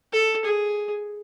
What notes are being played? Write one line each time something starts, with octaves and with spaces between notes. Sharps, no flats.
A4
G#4